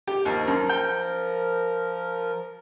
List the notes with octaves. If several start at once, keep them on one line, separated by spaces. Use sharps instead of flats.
G4
D#2 F3 A#4
F#2
G5